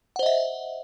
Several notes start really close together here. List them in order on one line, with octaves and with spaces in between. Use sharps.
F#5 C5 D#5 E5